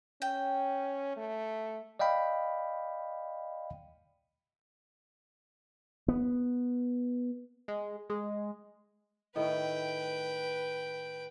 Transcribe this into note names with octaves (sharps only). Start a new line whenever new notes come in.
C#4 G5
A3
D5 D#5 F5 G5 B5
B3
G#3
G#3
A2 D#3 A3 B4 G5